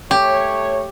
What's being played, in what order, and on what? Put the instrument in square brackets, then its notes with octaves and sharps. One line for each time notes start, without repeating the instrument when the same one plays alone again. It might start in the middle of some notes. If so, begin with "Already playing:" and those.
[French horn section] A3 C#5 [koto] G4